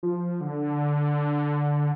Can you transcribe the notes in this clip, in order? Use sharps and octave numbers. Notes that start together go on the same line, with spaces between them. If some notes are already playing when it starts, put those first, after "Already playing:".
F3
D3